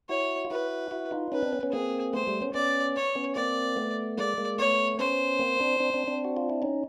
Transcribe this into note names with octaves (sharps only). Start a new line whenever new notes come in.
E4 F#4 C#5
F4
E4 F#4 B4
E4 F#4
D#4 F4
C#4 D#4 B4
C4 D4
B3 C#4
B3 C#4
A#3 C4 G#4
A3 B3 C5
G3 A3
B3 C#4
B3 C#4 D5
C#5
B3 C#4
A#3 C4 D5
A3 B3
G#3 A#3 D5
G#3 A#3
A3 B3 C#5
B3 C#4 C5
A#3 C4
C4 D4
C4 D4
C4 D4
C4 D4
F#4
F4
E4
C#4 D#4